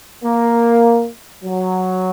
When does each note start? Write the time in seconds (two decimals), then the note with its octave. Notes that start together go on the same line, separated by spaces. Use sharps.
0.24 A#3
1.43 F#3